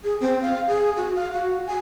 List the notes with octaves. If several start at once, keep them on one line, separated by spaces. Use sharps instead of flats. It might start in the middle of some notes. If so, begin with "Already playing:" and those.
G#4
C4
F5
G#4
F#4
F5
F#4
G#5